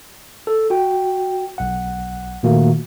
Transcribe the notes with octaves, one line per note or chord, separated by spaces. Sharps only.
A4
F#4 G5
B1 F#5
A#2 D#3 A3 A#3 F#4